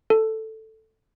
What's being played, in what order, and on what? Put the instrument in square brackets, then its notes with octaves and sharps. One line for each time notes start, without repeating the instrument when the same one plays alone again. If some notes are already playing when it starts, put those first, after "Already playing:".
[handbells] A4